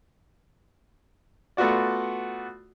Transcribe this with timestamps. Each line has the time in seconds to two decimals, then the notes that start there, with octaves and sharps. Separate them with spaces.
1.57 A3 B3 F4 F#4 D5